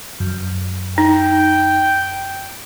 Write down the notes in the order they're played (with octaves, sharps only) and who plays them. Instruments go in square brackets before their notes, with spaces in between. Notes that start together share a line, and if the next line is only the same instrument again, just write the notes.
[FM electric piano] F#2
[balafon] D#4 [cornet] G5